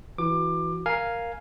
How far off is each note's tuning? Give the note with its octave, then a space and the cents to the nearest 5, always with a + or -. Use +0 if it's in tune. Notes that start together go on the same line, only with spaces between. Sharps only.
E3 +0 F#4 +0 D6 +20
A#4 +0 F5 +0 G#5 +0